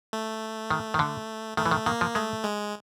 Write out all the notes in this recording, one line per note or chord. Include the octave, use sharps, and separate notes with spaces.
A3
D#3
D#3
D3
D#3 A3
E3
D#3
D#3 A#3
F3
G#3 A3
G#3